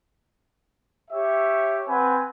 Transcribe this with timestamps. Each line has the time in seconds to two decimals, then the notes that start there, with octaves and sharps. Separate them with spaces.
1.11 G4 C#5 E5
1.88 C4 B4 F#5 G#5